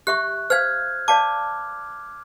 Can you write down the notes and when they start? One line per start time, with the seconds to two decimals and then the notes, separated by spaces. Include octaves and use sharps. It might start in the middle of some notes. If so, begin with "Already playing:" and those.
0.07 G4 E5 C#6 F#6
0.50 C5 F5 F6 G#6
1.08 D5 F5 A5 D6